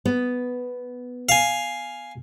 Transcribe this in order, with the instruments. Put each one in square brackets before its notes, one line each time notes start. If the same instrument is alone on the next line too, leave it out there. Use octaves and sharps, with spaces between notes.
[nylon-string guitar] B3
[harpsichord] F5 G#5